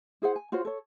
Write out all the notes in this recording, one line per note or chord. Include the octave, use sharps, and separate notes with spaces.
E4 G#4 C5 F#5
G#5
F4 F#4 C5 C#5
A4 C#5